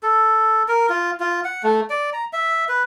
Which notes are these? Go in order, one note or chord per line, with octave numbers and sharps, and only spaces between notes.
A4
A#4
F4
F4
F#5
A3
D5
A#5
E5
B4